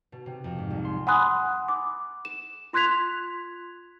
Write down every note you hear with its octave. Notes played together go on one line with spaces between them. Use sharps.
B2
C3
F2
G#2
C2
C6
F#5 G#5 B5 C6 D#6 F#6
D6
E7
F4 C6 F#6 G#6 B6 F7